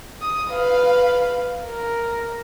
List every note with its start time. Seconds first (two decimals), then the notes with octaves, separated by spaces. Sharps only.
0.22 D#6
0.51 B4 F5
1.66 A#4